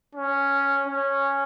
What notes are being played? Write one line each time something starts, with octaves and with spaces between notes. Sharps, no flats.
C#4
C#4